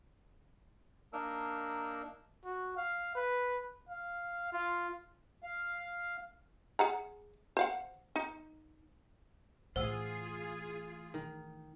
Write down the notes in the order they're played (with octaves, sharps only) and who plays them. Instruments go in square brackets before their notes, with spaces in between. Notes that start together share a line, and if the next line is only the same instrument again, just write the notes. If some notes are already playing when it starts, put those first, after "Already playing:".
[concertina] A#3 D4 D#4 A#4 E6
[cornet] F#4
F5
B4
F5
F4
[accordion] F5
[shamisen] G#4 F#5 A#5
C5 F5 F#5
D#4
[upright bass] A2 E3 [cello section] F4 G#4 [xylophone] C5 F#5 E6
[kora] D#3